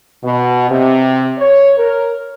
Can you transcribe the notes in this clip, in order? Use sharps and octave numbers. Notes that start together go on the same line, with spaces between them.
B2
C3
C#5
A#4